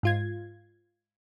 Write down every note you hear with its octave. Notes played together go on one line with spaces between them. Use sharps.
G#2 F4 G#6